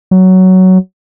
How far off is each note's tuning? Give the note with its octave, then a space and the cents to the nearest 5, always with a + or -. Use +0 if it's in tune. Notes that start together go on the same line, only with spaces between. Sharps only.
F#3 +10